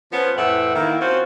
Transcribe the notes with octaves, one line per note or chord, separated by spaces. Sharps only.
F3 B3 C#4
F2 A2 E3 C4 E5 F#5
D#3 A#3 E4
C4 C#4 F4 F#4 C5